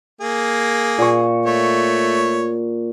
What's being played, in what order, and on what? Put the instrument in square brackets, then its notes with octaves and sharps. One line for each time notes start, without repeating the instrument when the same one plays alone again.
[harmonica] A#3 G#4
[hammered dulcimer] A#2 C#6
[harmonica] A3 C#5